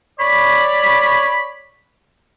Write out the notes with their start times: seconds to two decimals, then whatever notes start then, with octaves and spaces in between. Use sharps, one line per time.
0.19 C#5 D5 B5